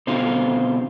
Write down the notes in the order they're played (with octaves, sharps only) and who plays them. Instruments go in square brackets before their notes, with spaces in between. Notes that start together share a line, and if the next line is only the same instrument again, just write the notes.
[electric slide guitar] B2 D3 C4 F4